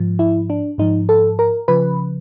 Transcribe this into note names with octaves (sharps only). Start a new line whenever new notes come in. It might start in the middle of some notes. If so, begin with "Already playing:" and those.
Already playing: G#2 F3
E4
D4
G#2 F3 D#4
A4
A#4
C#3 F3 B4